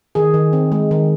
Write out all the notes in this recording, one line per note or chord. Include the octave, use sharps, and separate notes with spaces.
D#3 G#4
D#3
C4
G#3
D#3